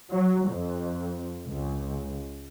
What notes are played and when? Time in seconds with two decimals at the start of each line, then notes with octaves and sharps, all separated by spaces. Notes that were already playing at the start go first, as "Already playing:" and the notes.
0.11 F#3
0.50 F2
1.47 C#2